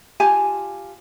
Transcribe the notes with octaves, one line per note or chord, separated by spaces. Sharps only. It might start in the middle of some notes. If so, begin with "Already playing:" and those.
F4 G4 G#5 A5